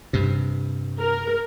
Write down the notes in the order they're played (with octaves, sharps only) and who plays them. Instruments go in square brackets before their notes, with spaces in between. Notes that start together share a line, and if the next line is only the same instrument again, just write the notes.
[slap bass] G2 C3
[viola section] A#4